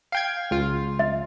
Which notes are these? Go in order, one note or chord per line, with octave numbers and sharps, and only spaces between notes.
F5 G5 G#6
C#2 F4
E5